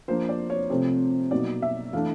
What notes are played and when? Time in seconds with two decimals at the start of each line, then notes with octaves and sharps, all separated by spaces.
0.08 F3 A#3 D4 C5
0.29 D5
0.50 C#5
0.70 C3 F3 A3 C4 C5
1.31 B2 F#3 A#3 D#4 D5
1.62 E5
1.93 E3 A3 D4 F5